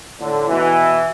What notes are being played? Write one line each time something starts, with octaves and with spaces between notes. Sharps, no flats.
A2 D3
B2 E3